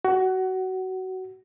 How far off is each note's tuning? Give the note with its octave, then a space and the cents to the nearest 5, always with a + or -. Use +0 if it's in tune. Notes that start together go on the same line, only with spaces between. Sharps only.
F#4 +20